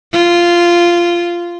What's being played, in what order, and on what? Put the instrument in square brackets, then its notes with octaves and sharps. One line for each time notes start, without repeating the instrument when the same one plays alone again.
[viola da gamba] F4